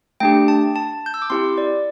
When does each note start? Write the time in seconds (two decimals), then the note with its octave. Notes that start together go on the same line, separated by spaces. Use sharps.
0.20 A3 D4 G4 G5
0.48 A5
0.76 A5
1.06 G6
1.14 E6
1.22 D6
1.30 C4 E4 G4 C6
1.58 D5